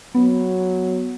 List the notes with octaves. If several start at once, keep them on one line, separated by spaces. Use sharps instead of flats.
F#3 B3